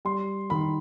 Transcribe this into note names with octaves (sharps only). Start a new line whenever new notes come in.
G3 C6
D#3 B5